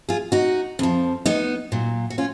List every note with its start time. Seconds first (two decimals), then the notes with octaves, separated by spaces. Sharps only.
0.09 F4 G#4
0.32 D#4 F#4
0.79 F2 F3
1.26 B3 D#4
1.72 A#2 F#3
2.10 F#4
2.18 C#4 F4